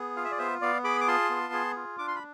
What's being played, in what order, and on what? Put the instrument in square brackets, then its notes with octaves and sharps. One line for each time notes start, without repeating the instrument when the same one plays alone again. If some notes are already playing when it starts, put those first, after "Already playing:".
Already playing: [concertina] B3 G#4
F4 F5
E5
D5
B3 C5 E5
B3 D5 F5
G#4 B5 D6
D6
F4 A5 C6
B3
G#4
F4
D4 D6
C6
B5